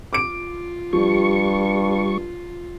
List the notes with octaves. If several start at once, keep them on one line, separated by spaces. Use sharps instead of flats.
F4 D6 D7
G2 F3 G3 C#6